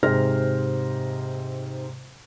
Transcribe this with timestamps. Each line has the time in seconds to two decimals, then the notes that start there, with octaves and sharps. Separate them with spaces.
0.03 G#2 C3 G#4 C5 F6 A#6